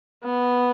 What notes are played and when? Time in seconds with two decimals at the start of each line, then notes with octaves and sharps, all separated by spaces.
0.24 B3